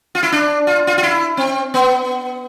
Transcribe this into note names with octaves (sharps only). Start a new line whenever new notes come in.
F4
E4
D4
F4
F4
F4
E4
C4
B3